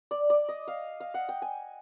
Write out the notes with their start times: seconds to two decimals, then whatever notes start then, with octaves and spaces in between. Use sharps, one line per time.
0.11 D5
0.30 D5
0.49 D#5
0.68 F5
1.00 F5
1.14 F#5
1.29 G5
1.42 G#5